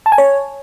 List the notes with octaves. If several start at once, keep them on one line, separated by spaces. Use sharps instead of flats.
A5
G#5
C#5